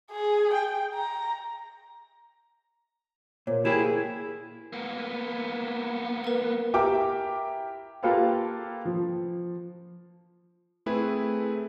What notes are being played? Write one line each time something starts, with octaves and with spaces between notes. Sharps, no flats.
G#4
G5
A#5
A#2 A#4 C5 C#5
A#3 E4 G4 G#4 G#6 D#7 E7
A#3 B3
A#4 B4
E4 G4 A#4 E5 G5 D6
A#3 F4 G4 A4 B4 F5
F3
A3 C4 E4 G#4 B4